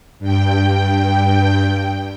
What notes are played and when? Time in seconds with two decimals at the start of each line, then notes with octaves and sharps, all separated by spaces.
0.19 G2 G5